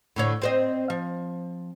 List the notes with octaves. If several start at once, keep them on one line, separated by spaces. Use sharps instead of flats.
A2 D3 C#5
C4 C5 D#5
F3